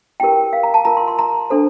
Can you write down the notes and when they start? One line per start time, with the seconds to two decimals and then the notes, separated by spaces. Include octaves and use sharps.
0.20 E4 G4 A#4 G5
0.53 F5
0.63 A#5
0.74 A5
0.85 F4 A#4 A#5
0.97 C6
1.08 C6
1.19 A#5
1.50 D4 A4 C5